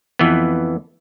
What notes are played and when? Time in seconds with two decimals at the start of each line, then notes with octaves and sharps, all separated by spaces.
0.19 F2 E3 B3